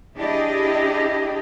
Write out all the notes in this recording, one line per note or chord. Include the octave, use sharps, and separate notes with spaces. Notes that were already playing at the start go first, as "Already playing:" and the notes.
D4 E4 G4 G#4 D#5